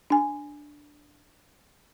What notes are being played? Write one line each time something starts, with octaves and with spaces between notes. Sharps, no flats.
D4 G#5